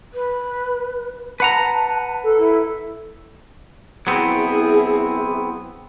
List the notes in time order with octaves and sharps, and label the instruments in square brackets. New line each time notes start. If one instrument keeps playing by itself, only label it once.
[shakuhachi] B4
[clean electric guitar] B4 F#5 A#5 [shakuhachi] A5
[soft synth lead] A4
[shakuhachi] E4
[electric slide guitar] F#3 B3 C4 [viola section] E4 G#4